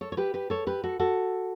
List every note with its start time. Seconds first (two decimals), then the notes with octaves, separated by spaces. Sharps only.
0.01 A4 C#5
0.12 C#5
0.17 G4 B4
0.34 G4 B4
0.50 A4 C#5
0.67 G4 B4
0.84 F#4 A4
0.99 F#4 A4